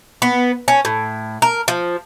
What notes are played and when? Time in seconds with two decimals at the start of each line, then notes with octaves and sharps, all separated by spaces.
0.22 B3
0.68 C#4
0.85 A2
1.42 A#4
1.68 F3